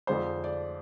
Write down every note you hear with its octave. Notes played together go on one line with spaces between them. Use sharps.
F2 D3 F3 G#3 C5
D5